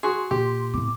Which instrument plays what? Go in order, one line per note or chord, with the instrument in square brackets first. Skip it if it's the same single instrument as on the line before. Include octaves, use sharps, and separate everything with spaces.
[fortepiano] F#4 G#4 [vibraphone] C6
[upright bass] A#2 [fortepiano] G4
[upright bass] A2 C4 [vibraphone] D6